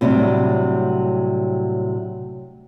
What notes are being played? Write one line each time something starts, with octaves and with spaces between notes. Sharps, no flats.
A2 C3 F#3 G3 D4